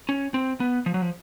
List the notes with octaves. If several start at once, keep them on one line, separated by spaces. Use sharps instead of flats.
C#4
C4
B3
F3
F#3
F3